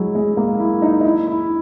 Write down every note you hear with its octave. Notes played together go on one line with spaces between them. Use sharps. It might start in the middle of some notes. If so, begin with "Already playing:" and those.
Already playing: F#3 G#3 E4
G#3
A#3
E4
D#4
D#4
E4
E4